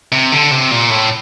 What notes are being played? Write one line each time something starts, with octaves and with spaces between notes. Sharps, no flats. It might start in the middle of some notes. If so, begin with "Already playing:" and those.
C3
D3
C3
A#2
A2